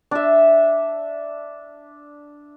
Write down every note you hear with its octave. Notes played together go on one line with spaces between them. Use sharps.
D4 E5